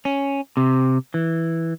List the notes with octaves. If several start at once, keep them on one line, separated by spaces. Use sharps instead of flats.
C#4
C3
E3